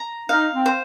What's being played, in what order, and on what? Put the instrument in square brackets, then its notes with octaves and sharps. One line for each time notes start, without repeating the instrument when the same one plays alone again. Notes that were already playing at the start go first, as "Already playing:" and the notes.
Already playing: [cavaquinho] A#5
[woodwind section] D#4 [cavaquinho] F5
[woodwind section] C4
[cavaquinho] C5